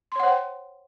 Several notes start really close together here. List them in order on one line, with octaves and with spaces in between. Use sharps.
C6 C#5 F#5 C5 G5